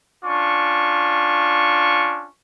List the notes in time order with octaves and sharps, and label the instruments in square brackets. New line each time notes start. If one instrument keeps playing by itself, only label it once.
[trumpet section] C#4 D4 F4 C#6